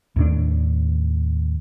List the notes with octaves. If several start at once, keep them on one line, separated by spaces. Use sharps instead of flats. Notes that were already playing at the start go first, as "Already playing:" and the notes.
D#2 A2 D4